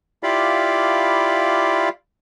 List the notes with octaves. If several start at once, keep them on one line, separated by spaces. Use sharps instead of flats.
E4 F4 G4 D5 F5 B5